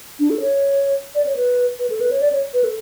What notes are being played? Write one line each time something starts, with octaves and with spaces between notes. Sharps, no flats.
D4
A4
C#5
D5
C#5
B4
B4
A4
B4
C#5
D5
C#5
B4
A4